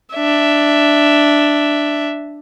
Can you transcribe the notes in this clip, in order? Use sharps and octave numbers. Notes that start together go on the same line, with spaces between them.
D4 E5